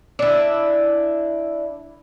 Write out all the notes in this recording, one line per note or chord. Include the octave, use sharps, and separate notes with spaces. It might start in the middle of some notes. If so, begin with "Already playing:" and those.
D4 E4